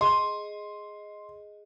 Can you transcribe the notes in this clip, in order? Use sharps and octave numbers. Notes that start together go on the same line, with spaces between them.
G#4 D#5 C6